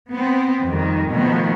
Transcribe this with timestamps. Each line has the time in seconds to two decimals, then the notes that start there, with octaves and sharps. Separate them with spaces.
0.12 B3 C4
0.65 F2 D#3 G3
1.10 B2 D#3 F3 A3 B3